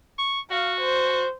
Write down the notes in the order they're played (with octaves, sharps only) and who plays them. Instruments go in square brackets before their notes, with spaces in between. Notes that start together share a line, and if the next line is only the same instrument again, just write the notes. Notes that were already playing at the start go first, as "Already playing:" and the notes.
[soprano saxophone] C#6
[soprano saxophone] F#4 [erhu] F5
[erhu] C5